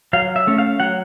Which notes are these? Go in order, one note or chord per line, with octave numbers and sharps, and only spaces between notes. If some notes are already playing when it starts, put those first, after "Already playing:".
F#3 F5
E5
A3 C#4
F5
F#3 F#5